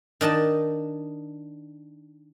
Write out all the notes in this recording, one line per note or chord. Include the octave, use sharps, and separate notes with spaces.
D#3 D4 D#5 A5